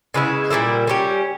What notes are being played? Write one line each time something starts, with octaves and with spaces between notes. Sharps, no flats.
C#3 G#3 B3 E4
A#2 G3 A#3 E4
G3 C#4 G4